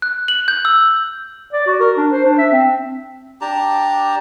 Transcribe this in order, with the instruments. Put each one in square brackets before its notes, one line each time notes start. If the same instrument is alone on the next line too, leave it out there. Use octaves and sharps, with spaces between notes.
[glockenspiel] F#6
F#7
G6
E6
[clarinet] D5
F#4
A#4
D4
C5
D4
E5
C4
[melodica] D4 G4 A5 A#5